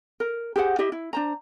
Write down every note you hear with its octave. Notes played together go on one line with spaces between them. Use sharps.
A#4
G4 G#4 C5 F#5
E4 G4 D#5 E5
E4
D4 C5 A#5